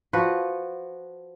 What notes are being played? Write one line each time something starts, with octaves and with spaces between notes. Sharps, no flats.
F3 F#4 B4